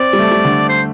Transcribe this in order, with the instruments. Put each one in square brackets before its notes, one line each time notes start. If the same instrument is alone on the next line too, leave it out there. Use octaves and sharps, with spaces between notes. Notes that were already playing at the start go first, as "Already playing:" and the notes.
Already playing: [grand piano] C4 [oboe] D5
[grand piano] G3
A3
G3
D3
[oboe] C5